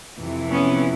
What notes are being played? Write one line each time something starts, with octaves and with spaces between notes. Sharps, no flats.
F2 C3 E3
B3 C#4